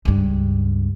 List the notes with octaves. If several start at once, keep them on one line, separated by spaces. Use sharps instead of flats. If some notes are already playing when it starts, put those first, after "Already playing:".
C#2 G2